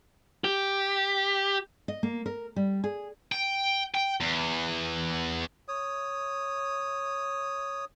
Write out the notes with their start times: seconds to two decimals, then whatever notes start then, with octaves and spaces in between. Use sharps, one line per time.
0.44 G4
1.88 D#5
2.03 A#3
2.26 A#4
2.56 G3
2.84 G#4
3.32 G5
3.95 G5
4.20 E2
5.68 C#5 D#6